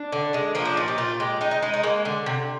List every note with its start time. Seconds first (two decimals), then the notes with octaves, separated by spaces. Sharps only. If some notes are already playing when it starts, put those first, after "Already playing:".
Already playing: D4
0.12 D3
0.34 G#3
0.55 F3 A#3
0.65 D4
0.77 A#2 D#4
0.88 G4
0.98 A#2 F4
1.20 G#3 G4
1.41 G#3 D#4
1.51 D#4
1.62 G#3 D#4
1.74 D#4
1.83 G#3 A#3
2.05 D3
2.26 C3